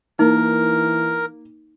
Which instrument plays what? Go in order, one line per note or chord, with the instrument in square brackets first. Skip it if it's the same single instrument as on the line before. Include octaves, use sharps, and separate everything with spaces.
[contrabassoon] E3 [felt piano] A#3 [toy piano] D#4 [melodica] A#4